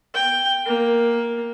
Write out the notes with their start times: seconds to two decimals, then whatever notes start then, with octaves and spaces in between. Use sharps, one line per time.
0.14 G5
0.66 A#3